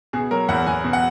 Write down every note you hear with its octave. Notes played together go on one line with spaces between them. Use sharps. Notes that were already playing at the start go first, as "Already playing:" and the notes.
B2 G#4
F#3 A#4
E2 F#5
E2 G#5
B2
F#5